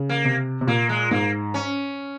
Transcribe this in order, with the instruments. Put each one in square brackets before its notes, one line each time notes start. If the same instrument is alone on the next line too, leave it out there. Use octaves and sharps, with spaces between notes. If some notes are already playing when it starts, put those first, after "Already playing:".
Already playing: [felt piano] C#3
[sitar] A#3
[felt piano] C3
C3
[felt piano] A#2 [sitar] A#3
[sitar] G#3
[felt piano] G#2 [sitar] A#3
[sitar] C#4